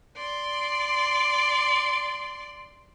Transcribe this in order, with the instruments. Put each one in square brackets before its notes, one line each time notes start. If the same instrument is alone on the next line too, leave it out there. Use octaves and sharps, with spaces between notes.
[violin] D5 C6